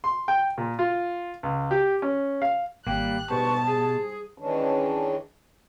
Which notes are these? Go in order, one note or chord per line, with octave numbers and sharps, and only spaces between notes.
C6
G5
A#2
F4
C#2
G4
C#4
F5
G#1 G3 A#3 G4 F#6
D2 G#2 B2 G3 B4 C5 A5 C#6
G#4
D#3 E3 G#3 C#4 D4